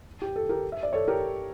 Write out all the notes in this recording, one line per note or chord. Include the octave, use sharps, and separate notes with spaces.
G4
A4
G4 A#4
E5
D5
A4 C#5
G4 A#4